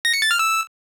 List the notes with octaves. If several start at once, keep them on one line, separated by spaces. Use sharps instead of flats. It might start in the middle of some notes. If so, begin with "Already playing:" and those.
A#6
C#7
A6
F6
E6